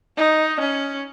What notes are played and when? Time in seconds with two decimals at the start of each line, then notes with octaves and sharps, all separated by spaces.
0.18 D#4
0.60 C#4